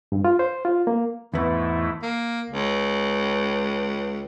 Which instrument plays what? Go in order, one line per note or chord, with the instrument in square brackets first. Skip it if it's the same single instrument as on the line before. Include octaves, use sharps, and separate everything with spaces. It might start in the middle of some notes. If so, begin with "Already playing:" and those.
[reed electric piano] G2
F4
C5
F4
A#3
[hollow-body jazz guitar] E2 B3 [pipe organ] G#2 A3 E4
[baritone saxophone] A#3
C#2